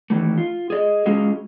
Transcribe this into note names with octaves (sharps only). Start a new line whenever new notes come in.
D#3 E3 A3
F4
G#4 D5 D#5
G#3 C#4 F4 F#4 G#4